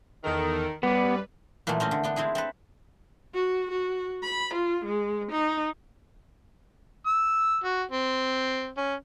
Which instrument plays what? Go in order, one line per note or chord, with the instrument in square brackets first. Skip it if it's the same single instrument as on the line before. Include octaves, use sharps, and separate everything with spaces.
[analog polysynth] E2 A4 A#4 [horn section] D#3
[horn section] F#2 D5 [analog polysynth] G3 B4 [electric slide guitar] B3
[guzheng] A#2 E3 F#3 G#3 A3
A3 C4 C#4 D#5
D3
B3 D4 G5
G#3 C4 E4 G#4
C4 A4 B4
[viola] F#4
F#4
B5
F4
G#3
D#4
[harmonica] E6
F#4
C4
C#4